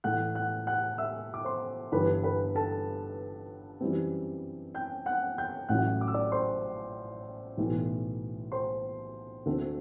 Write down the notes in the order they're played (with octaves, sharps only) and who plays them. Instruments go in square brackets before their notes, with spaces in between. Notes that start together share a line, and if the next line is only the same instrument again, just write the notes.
[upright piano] A2 E3 A3 F#5 F#6
F#5 F#6
F#5 F#6
E5 E6
D6
C5 C6
G1 G2 E3 B4 B5
B4 B5
A4 A5
F#2 E3 G3 C4
G5 G6
F#5 F#6
G5 G6
A1 A2 F#3 F#5 F#6
D6
E6
D5 D6
C5 C6
B1 A2 E3
C5 C6
D2 D3 A3 C4